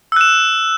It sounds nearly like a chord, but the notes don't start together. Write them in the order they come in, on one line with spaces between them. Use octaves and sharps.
E6 F#6 E7